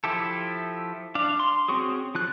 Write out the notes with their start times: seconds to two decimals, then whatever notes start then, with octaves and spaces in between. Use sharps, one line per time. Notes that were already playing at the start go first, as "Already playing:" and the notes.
0.04 F3 E4 G4 A4
1.15 D4 F5
1.40 C6
1.68 C4 C#4 F#4 G#4
2.15 F3 F4 F#6